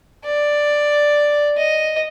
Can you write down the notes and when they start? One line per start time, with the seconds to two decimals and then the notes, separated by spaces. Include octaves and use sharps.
0.24 D5
1.57 D#5